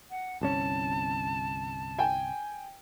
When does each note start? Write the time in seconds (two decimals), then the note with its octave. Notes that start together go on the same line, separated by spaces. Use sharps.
0.11 F#5
0.41 G1 C2 C#4 A5
1.98 G5 G#5